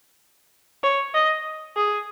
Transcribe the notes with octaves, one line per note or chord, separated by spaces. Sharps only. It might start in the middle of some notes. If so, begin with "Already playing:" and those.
C#5
D#5
G#4